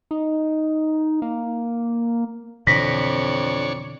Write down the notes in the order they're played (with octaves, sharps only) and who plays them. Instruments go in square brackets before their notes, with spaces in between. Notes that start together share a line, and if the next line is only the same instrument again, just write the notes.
[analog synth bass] D#4
A#3
[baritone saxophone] F2 [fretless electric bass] B2 D3 E3 [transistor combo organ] D4 C#5 [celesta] A#6 B6